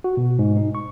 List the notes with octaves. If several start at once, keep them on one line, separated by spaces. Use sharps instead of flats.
F#4
B2
G#2
D#4
C#6